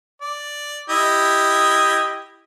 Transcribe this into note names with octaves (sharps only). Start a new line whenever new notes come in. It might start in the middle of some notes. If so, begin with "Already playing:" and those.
D5
E4 G4 D#5